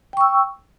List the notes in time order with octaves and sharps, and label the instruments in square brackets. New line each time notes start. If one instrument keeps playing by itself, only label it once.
[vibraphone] G5
C#6
E6